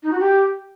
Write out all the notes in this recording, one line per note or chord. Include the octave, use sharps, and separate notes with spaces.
D#4
F#4
G4